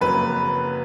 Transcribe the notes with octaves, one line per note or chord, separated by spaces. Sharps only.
F#1 F2 C#3 F#3 A#3 B4